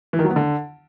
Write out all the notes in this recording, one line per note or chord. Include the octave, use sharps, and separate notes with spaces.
E3
D#3
F#3
B3
D3